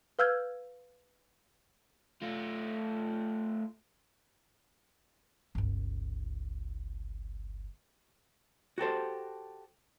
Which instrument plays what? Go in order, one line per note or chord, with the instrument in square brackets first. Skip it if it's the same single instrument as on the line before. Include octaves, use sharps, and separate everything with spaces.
[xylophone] B4 F5 E6 F6 G6 G#6
[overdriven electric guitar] A3 F4
[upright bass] G1 C#2
[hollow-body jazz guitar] F#4 G4 A4 C5